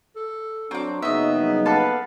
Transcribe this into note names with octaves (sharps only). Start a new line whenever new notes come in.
A4
F#3 C4 D4 A#5 C#6 D6
F#1 C#3 B3 D#4 D#5 E5
F#3 G3 A#3
A4 B4 F5 F#5 B5 D6